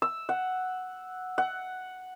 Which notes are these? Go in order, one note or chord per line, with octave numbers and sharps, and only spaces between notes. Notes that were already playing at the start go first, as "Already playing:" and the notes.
E6
F#5
F#5